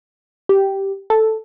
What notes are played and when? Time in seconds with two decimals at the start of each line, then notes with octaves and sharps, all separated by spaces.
0.49 G4
1.10 A4